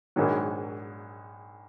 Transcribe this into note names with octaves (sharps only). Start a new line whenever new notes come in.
A#1 G#2 D#3 F#3